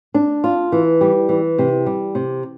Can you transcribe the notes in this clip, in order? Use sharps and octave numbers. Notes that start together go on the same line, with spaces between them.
D4
F4
E3
G3
E3
C3
G3
C3